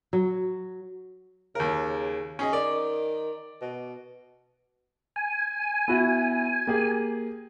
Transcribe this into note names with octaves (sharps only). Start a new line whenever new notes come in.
F#3
D#2 C#3 A#4
C#4 G#4 D#5
D#3 D5
B2
G#5
B3 E4 F#4
A#3 G4 G#4